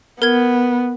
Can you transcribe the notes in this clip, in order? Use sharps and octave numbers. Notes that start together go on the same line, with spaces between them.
B3 A#4 G#6